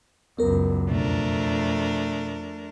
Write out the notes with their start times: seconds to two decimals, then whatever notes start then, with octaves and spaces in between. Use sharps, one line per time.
0.38 C#2 F#2 B3 A#4
0.89 F2 B2 A3 D4 A#4